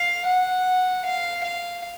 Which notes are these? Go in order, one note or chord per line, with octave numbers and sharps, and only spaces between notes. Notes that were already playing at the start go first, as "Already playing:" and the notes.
Already playing: F5
F#5
F5
F5